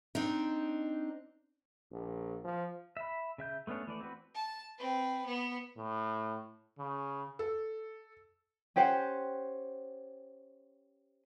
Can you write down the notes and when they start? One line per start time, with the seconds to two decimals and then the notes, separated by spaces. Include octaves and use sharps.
0.15 C4 D4 D#4
1.92 A#1
2.44 F3
2.97 E5 B5
3.38 C#3 E5 G6
3.67 A3 B3 C#4 D4 C#5
3.87 E3 A3 D5
4.01 C4 F#4 B4
4.34 A5
4.78 C4 B4
5.25 B3
5.77 A2
6.79 C#3
7.39 A4
8.76 C#4 G4 C5 F#5